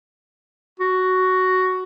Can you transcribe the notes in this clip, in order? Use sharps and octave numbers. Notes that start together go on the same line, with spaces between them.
F#4